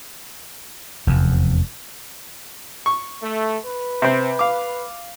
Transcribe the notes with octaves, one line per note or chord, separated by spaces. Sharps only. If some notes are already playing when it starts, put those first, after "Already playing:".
F1 E2
C#6
A3
B4
C3 C4
F5 D6